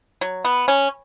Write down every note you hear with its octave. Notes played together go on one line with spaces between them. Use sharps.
F#3
B3
C#4